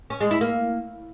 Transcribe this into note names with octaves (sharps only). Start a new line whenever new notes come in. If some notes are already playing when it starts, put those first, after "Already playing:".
C#4
G#3
E4
A#3